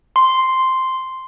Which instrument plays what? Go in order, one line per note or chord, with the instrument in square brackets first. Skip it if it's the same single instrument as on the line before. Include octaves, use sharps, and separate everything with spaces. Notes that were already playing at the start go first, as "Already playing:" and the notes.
[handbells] C6